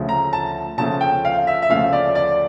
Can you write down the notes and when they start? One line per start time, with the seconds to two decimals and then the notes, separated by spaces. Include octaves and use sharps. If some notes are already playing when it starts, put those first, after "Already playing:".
Already playing: D2 C#3 F3 A3
0.09 A#5
0.33 A5
0.78 D2 C#3 F3 A3 A5
1.01 G5
1.25 F5
1.47 E5
1.62 E5
1.70 D2 C#3 F3 A3 F5
1.93 D5
2.15 D5